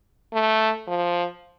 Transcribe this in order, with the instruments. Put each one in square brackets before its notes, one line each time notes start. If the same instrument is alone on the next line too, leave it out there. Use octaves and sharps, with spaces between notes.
[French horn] A3
F3